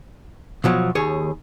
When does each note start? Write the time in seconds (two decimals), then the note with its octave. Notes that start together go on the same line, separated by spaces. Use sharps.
0.64 B2 F3 F#3
0.95 D#2 G#4 C#5